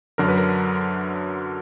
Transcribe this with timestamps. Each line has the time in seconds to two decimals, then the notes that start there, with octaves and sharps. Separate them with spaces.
0.18 F#2 D3 F#3 A#4
0.28 B4
0.38 A#4